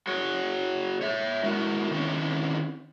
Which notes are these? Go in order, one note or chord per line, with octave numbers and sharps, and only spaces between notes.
F#4 G#4 C#5
C#5 E5
G#3 E4 F#4 A#4
D#3 E3 C4 C#4